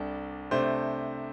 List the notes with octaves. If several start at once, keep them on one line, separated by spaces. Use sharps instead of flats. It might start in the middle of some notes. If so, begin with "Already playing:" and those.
Already playing: C2 C3 G3 D4 A4
C3 A3 D4 C5